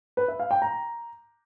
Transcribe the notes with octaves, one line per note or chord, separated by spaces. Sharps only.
B4
E5
F5
G5
A#5